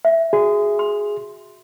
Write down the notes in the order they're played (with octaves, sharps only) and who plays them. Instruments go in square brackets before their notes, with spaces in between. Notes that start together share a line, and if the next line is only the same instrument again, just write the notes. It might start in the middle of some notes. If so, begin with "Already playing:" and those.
[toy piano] E5
[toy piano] F#4 [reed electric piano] G#4
[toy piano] C6